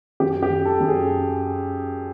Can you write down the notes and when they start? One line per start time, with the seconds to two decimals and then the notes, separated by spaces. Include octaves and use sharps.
0.20 F#2 G4
0.43 G4
0.50 F#3
0.65 A4
0.81 F#2
0.88 G#4